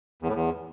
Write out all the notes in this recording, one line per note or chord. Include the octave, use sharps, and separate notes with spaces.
E2
A2
E2